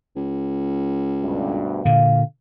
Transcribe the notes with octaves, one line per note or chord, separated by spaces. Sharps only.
C#2
D2 G2 B2
A#2 D3 F5